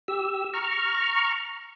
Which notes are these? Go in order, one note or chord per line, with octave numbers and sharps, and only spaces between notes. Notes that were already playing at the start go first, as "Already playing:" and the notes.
G4 E6
A#5 C#6 F6